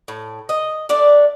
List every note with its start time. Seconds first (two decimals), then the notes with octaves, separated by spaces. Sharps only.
0.08 A2
0.49 D#5
0.89 A3 D4 D5